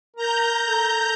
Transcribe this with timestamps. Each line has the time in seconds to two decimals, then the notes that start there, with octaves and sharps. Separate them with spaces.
0.16 A#4 A#5 G6
0.67 A4